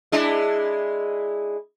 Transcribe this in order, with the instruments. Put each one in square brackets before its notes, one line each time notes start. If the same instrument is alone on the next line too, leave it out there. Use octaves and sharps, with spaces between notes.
[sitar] G#3 D4 E4